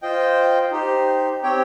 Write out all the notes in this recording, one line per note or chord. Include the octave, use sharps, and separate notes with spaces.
F4 C5 D#5 G5
D#4 G4 C5
C4 G4 C#5 G5